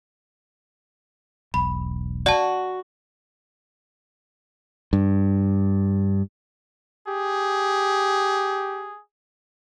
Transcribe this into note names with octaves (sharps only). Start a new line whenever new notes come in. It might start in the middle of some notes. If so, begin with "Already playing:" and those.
E1 B1 B5
F#4 D5 A5
G2
G4 G#4